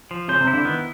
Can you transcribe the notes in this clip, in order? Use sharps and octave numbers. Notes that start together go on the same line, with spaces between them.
F3
C#3 C#4 C5
C3 C4
E4
D3 D4
D#3 B3 D#4